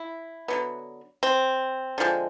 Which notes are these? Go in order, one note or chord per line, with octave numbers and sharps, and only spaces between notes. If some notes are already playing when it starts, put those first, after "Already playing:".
Already playing: E4
D3 F#3 B3
C4
D3 F3 G#3